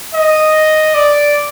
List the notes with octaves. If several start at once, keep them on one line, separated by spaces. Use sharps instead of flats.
D#5
D5